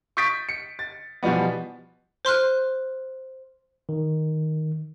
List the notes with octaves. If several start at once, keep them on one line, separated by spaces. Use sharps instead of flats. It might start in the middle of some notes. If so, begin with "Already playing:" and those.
C#6 D#6 G6 A6 B6 D7
C#7
A6
B2 E3 F3 G3 B3
C5 C6 F6 F#6
D#3